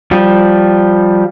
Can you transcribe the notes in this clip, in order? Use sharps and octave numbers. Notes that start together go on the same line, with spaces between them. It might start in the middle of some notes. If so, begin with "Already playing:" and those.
F3 G3